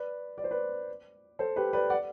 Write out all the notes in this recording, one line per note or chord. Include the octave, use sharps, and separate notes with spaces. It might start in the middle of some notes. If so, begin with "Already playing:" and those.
Already playing: B4 D5
D5
C5
B4 D5
A4 C5
G4 B4
B4 D5
D5 F#5